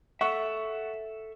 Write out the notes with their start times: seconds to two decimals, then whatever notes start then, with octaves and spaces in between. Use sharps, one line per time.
0.21 A4 E5 F#5 C#6